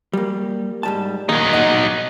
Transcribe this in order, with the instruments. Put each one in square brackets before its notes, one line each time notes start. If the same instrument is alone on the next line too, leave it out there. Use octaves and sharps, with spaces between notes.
[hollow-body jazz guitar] G3 A#3
G#2 G3 A5
[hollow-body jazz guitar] D#3 A#3 G#4 [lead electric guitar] F#3 D#4
[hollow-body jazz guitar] D#5 F#5